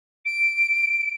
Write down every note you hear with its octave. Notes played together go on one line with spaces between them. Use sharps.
D7